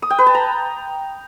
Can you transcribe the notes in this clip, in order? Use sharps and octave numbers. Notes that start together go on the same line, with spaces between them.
D#6
G5
B4
A5
A#5